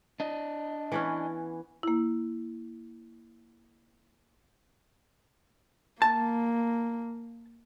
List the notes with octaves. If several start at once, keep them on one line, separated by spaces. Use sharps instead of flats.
D4 D#5
E3 B3 C#4
A#3 E4
A#3 A5